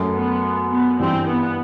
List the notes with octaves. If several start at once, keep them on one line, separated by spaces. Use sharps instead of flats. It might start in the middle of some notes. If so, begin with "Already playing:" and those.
Already playing: F#2 F#3 A3
B3
B3
G2 E3 G3 C4 D4
B3